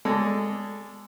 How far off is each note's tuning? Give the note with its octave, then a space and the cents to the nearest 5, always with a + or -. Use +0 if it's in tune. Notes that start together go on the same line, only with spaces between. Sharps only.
G#3 -15 A4 +0 D5 -20